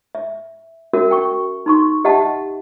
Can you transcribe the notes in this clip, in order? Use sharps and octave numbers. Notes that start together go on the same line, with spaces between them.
E5
C#4 F#4 A#4 E5
G5 C#6
D#4 C6 C#6
G4 D#5 E5 F#5 A5